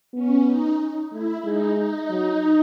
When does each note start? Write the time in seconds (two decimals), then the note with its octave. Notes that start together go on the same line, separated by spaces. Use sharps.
0.14 B3 C#4
0.47 D#4
1.12 A3 E4
1.44 G#3 D#4
1.77 D#4
2.09 F#3